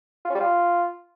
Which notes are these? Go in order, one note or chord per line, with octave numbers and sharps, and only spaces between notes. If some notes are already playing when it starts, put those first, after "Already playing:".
F4
C#4
G3
F4